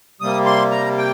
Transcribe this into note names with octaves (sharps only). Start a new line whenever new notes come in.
C3 G3 A#3 D#6
C6
A#5
G5